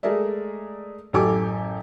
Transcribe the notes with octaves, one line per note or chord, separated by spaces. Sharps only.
G#3 A3 G#4 A#4 D5 E5
A1 F#2 G4 A4 G#5 D6